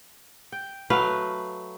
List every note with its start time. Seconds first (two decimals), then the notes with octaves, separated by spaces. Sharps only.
0.52 G5
0.90 F#3 A3 B4 F5